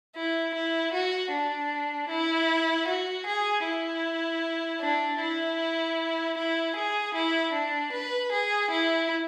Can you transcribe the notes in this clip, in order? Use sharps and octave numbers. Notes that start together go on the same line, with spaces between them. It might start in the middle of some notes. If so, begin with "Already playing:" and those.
E4
E4
F#4
D4
E4
F#4
G#4
E4
D4
E4
E4
G#4
E4
D4
B4
G#4
E4